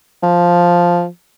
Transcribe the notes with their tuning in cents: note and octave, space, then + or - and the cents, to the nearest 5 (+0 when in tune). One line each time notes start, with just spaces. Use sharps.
F3 +0